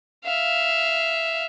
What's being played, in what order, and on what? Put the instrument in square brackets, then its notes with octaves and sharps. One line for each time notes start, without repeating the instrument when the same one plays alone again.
[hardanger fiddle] E5 F5